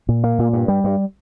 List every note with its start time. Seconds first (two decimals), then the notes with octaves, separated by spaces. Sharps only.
0.09 A#2
0.24 A#3
0.39 A#2
0.53 G2
0.68 G3
0.84 G2